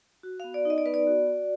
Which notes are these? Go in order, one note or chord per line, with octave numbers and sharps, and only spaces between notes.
F#4
B3 F5
D5
D#4 D#5
D5
B3 B4
D5
F#4
F#4